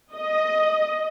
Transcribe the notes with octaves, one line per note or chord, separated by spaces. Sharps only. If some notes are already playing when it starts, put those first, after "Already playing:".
D#5